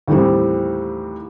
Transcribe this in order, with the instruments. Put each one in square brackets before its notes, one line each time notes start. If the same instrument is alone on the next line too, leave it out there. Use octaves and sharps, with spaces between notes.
[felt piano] D#2 A2 E3 G3 C4